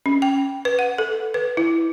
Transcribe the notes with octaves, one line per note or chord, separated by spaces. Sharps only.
C#4
G5
B4
F#5
A4
B4
E4